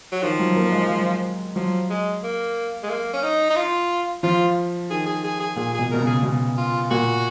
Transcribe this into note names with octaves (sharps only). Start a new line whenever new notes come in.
F#3
D#3 F3
F#3
A#3
G#3
F#3
F3 F#3
G#3
A#3
G#3
A#3
C#4
D#4
D#4
F4
F3 F4
D#3 G#4
G#4
G#4
G#4
A#2 G#4
B2 G#4
B2 A#4
C#3 G#4
B2
F4
A#2 F#4